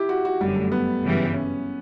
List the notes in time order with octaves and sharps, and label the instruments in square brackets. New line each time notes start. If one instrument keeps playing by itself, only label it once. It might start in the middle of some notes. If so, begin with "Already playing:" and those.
Already playing: [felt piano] E4 G4
F#4
F#4
[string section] G1 F#2 D3 [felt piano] G3
[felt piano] A3
B3
[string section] G1 F#2 C#3 E3 G3
[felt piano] C#4